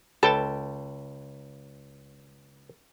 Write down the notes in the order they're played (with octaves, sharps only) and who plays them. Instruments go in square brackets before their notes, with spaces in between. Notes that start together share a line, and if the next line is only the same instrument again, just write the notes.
[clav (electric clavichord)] C#2 G5 A5 [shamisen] A4 B4